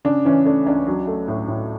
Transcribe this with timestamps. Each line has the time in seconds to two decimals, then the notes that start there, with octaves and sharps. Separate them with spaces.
0.05 C#3 D4
0.25 E3 C#4
0.45 A3 D4
0.66 C#2 D4
0.87 F#3 D4
1.07 A3
1.28 A2
1.48 A2